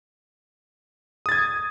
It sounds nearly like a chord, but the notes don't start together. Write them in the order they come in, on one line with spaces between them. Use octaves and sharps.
D#6 A6 G#6